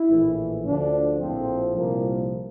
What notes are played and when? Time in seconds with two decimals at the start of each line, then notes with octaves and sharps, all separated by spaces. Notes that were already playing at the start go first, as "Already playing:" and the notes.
Already playing: E4
0.09 A#1 A2 E3
0.65 D2 D3 F3 D4
1.20 A#1 A2 F3 C4
1.76 C2 A#2 F3 A#3